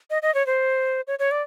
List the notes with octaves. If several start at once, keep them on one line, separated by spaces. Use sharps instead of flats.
D#5
D#5
C#5
C5
C#5
C#5
D5